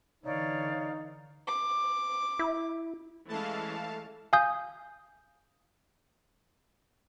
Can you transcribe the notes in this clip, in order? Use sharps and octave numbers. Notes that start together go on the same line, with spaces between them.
D3 E3 D#4 C#5 D5 F5
D6
E4
E3 G#3 A3 C#4 F5 A5
F5 G#5 D#6 G6